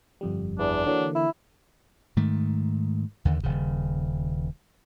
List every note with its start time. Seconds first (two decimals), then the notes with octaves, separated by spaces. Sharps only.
0.21 G1 F2 G3
0.59 E2 D4
0.86 D3 E3 F#3 A#3
1.15 E4
2.17 G#2 D#3 A3
3.25 D#2 D3
3.43 D#1 C#3